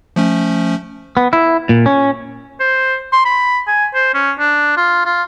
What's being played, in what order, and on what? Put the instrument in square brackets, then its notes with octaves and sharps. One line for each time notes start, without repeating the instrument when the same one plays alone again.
[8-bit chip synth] F3 A3 C#4
[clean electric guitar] B3
E4
A#2
C#4
[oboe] C5
C6
B5
G#5
C5
C#4
D4
F4
F4